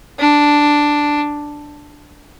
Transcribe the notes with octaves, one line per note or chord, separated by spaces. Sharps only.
D4